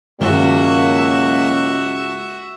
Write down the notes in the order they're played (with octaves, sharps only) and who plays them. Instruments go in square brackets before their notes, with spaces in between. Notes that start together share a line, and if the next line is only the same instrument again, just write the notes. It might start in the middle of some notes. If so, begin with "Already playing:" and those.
[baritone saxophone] C#2 [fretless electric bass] G2 D#3 G#3 [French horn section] F#3 A#3 [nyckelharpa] F#4 E5